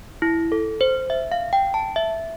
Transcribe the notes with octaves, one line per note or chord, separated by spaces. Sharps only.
E4
A4
C5
E5
F5
G5
A5
E5